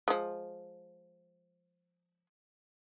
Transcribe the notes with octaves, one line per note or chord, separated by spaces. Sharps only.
F3 G#3